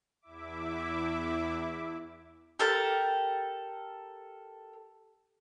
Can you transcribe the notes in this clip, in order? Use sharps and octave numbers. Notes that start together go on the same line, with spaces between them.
E2 E4 E5 D6
G4 A4 A#4 A5